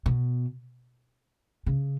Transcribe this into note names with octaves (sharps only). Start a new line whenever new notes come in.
B2
C#3